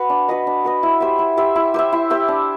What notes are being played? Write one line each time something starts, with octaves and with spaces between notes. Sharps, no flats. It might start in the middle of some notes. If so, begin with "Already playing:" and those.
Already playing: F#4 B4
D4
F#4 B4 D#5
D4
F#4 B4 D#5
E4
G4 C5 E5
E4
G4 C5 E5
E4
G4 C5 E5
E4
G4 C5 E5
D4